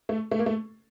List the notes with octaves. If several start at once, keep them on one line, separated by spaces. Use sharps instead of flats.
A3
A3
A#3
A3